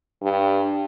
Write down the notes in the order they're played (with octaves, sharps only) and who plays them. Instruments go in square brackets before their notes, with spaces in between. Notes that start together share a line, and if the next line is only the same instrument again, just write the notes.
[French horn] G2